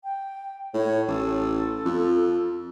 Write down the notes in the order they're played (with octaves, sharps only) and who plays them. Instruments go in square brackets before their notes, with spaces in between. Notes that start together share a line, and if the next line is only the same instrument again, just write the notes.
[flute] G5
[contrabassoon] A2 [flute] C#5
[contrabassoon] A1 [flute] A4
[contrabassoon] F2